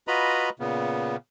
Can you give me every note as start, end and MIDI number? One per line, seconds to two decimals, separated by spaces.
0.08 0.50 65
0.08 0.50 66
0.08 0.50 71
0.08 0.50 75
0.08 0.50 82
0.08 0.50 83
0.59 1.16 46
0.59 1.16 49
0.59 1.16 59